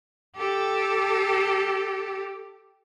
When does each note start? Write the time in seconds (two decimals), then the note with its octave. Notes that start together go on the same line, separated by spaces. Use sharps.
0.37 G4 A4